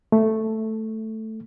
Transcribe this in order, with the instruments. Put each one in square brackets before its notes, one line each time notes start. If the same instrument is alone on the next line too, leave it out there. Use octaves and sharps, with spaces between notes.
[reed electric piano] A3